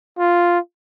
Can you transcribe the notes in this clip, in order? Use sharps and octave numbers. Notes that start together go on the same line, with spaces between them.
F4